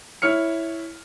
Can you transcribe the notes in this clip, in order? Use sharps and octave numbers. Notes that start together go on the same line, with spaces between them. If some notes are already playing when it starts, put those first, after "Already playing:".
E4 C#5 F6 C#7